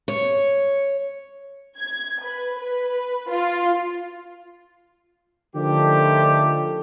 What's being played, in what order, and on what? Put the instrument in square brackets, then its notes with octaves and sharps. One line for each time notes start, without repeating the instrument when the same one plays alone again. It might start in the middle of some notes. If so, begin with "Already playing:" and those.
[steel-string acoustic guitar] C#5
[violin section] G#6
B4
B4
F4
[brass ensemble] D3 D#3 F3 A3 D4 G4